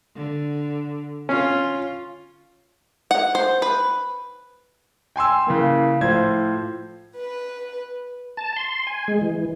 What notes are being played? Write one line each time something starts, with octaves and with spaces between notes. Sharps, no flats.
D3
C#4 F4
F#5
C5
B4
G5 G#5 C6 E6
C#3 E3 A#3
A2 F3 C5 G#6
B4
A5
C6
G#5
G#3
E3